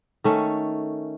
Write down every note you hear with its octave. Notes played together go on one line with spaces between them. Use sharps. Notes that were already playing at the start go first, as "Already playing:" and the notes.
D#3 A3 C#4